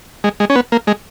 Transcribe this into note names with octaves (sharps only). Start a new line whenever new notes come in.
G#3
G#3
C#4
B3
A#3
G#3